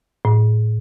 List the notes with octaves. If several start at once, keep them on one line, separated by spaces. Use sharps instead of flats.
A2